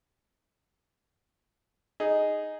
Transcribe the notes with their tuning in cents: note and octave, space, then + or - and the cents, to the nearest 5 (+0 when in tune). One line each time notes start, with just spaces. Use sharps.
D#4 -5 G#4 +0